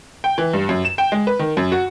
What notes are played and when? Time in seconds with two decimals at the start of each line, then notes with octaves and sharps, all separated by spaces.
0.24 G5
0.38 E3
0.53 G2
0.69 F#2
0.85 E7
0.98 G5
1.12 G#3
1.27 B4
1.39 D#3
1.57 F#2
1.72 F#4